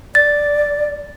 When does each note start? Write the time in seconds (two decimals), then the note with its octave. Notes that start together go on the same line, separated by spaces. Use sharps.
0.15 D5 A6